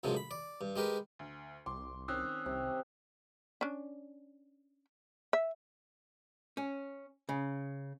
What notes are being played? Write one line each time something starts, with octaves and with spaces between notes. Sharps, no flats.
A1 F#2 C3 F3 G#3
B5
D5
G2
G#3 G4 A#4 B4
D2
C2 C6 D6
D#3 C4 C#4 D#6 E6 F#6
C2 C3
C#4 D4
E5
C#4
C#3